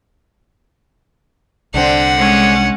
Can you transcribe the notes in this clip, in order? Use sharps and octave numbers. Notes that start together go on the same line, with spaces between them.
C2 D3 C4 D4 F#5
G#3 C#4